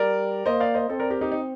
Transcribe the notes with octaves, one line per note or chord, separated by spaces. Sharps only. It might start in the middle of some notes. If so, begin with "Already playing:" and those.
Already playing: G3 A#4 D5
A#3 C5 D#5
D5 F5
C5 D#5
C4 A4 C5
A#4 D5
G4 A#4
D#4 G4
D#4